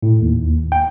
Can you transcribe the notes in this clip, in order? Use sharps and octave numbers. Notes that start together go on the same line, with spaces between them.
A2
D#2
G5